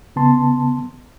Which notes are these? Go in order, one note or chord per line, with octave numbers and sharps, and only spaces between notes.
C#3 B3 A5 C6